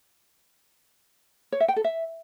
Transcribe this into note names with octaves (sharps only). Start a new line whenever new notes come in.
C#5
E5
G5
A4
E5